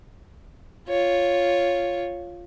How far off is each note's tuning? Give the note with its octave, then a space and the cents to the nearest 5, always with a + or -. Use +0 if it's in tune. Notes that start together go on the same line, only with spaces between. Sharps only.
F4 +0 C#5 +0